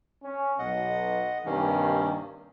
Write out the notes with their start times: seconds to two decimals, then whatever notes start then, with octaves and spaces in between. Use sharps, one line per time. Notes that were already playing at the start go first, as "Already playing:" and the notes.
0.24 C#4
0.59 B1 D#5 F#5
1.46 G2 C3 D#3 A#3 C#4